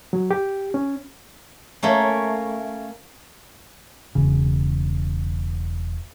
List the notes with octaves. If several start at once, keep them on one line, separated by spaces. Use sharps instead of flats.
F#3
G4
C#4
A3 A#3 C#4
E1 C#3